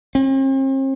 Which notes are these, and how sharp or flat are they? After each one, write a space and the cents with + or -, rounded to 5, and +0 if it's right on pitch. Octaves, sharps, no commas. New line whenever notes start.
C4 +45